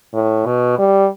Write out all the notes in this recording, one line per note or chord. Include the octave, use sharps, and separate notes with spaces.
A2
B2
G3